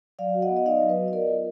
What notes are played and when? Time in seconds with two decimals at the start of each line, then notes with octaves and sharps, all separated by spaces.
0.19 F#3 D5 F5
0.34 F#4
0.42 D#5 F#5
0.49 B3
0.57 D#5
0.66 D#4 D5 F5
0.81 F#3
0.89 B4 D#5
0.97 F#4
1.08 D#5
1.13 B3 A#4 D5
1.28 F4